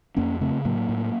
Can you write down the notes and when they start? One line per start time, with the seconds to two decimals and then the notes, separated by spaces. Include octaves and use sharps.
0.17 F2 A#3 C#4
0.41 C#3 A3 C4
0.65 A2 F#3 A#3
0.89 A2